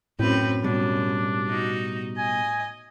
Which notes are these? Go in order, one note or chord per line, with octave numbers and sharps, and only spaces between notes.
F#2 A2 C4 B4 G5
F#2 B2 G3 D4
D#4 F#4
D#5 G#5